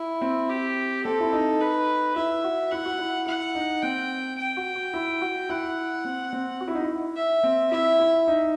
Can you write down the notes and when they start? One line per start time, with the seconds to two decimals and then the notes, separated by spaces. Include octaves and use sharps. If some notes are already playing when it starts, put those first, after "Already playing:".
Already playing: E4
0.21 C4
0.49 G4
1.05 C4 A4
1.20 E4
1.33 D#4
1.61 B4
2.16 E4 E5
2.44 F#4
2.71 E4 F#5
2.86 F#4
2.99 E4
3.27 E4 F#5
3.55 D#4
3.82 C4 G5
4.38 G5
4.57 F#4
4.75 F#4
4.94 E4
5.22 F#4
5.49 E4 F#5
6.05 C4
6.33 C4
6.61 F#4
6.68 E4
6.75 D#4
6.82 E4
7.16 E5
7.44 C4
7.71 E4 E5
7.99 E4
8.28 D#4